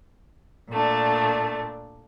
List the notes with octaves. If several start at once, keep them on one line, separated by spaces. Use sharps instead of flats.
A#2 A3 D4